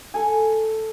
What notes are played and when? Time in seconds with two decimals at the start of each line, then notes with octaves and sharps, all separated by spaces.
0.14 A4 G#5